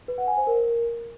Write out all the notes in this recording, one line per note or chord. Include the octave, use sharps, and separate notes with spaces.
B4
F#5
G#5
C5
A#4